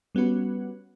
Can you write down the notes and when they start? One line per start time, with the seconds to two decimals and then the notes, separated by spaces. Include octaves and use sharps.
0.15 G3 B3 C#4 F#4 B4